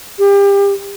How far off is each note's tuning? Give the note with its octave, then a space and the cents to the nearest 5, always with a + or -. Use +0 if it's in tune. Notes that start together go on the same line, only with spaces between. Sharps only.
G4 +30